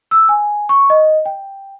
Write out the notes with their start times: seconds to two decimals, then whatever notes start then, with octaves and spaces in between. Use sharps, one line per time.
0.11 E6
0.29 G#5
0.69 C#6
0.90 D#5
1.26 G5